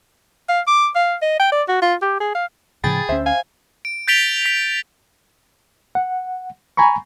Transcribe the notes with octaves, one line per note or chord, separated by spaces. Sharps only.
F5
D6
F5
D#5
G5
D5
F#4
F4
G4
G#4
F5
A2 C#3 F3 G#4 G5 B5 A6
D2 C#4 C5 E5
F5 G#5
D7
G6 A6 B6 D7 F7 G7
B6
F#5
G#5 A#5 B5 C#6